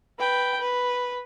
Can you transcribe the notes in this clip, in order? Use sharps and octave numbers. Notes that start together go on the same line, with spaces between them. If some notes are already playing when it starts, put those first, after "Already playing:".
B4 G5
B4